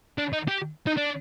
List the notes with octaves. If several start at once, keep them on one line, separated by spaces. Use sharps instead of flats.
D4
D#4
G4
D#4
D4